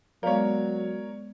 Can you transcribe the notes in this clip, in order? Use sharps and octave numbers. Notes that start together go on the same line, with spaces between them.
F#3 G#3 B3 A#4 C#5 D5 F5